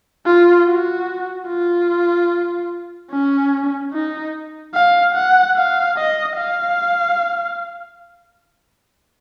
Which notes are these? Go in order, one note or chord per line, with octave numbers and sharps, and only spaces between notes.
F4
F#4
F4
C#4
D#4
F5
F#5
F5
D#5
F5